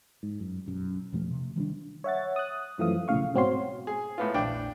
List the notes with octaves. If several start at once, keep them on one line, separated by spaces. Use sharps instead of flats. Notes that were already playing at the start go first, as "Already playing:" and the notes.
G#2
F#2
B1 F#2
E2 B2 F3 A3
C3
D#3 G3 C#4 D4
C#5 E5 F#5 A6
D#6 F#6
F#2 E3 F3 A3 F5 D#6
B1 A2 C#3 F5 C#6
G#2 B2 C4 F#4 C#5 C6
G#4
A2 B3 F4
A#1 E2 D4 G5